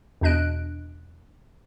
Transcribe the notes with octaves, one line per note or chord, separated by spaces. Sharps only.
E2 B2 D4 D#5 F#6 D7